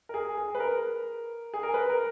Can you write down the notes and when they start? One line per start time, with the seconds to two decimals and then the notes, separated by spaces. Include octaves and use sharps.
0.09 A#4
0.14 G#4
0.37 G#4
0.55 B4
0.60 A#4
1.54 G#4
1.63 A#4
1.74 B4
1.90 A#4